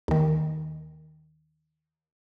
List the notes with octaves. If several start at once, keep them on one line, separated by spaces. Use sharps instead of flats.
D#2 D#3